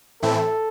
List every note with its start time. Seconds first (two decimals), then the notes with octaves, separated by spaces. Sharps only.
0.22 A2 E3 A3 C4 E4 A4